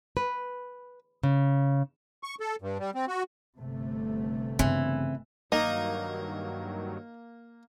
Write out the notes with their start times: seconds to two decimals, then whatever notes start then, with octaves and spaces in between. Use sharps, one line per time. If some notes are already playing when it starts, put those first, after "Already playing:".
0.17 B4
1.23 C#3
2.23 C#6
2.40 A4
2.62 G2
2.79 G3
2.95 C4
3.08 F#4
3.58 G1 C3 A3
4.59 G2 C#3 E3 B3 C4
5.52 G2 D#3 F#3 A#3 D#4